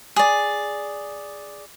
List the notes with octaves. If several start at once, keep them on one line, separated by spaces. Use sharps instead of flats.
G#4 D5